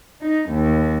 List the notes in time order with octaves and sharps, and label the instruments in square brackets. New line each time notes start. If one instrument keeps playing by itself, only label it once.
[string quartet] D#4
D#2